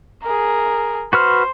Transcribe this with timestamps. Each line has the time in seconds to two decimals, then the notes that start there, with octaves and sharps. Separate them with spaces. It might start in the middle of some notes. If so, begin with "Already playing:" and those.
0.23 G#4 A#4
1.13 F#4 B4 C5 F6